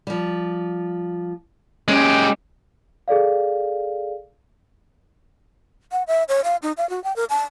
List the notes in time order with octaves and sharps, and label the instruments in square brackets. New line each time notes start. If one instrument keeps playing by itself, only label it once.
[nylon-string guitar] F3 G3
[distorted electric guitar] G#3 G4 [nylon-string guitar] C#4
[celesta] G#4 A4 D5 F5
[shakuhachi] F#5
E5
C#5
F5
D#4
F5
F#4
G5
A#4
A5